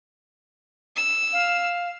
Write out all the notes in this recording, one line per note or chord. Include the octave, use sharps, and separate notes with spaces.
E6
F5